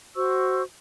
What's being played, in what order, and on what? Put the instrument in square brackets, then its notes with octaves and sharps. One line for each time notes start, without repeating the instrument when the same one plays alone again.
[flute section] F#4 C5 C#6 E6